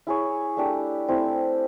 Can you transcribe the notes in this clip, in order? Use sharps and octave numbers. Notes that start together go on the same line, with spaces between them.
E4 G#4 C#5
A3 D4 G4
A3 C4 E4 G4